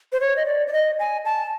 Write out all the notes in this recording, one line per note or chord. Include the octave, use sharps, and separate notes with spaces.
C5
C#5
D#5
D5
D5
D#5
G#5
A5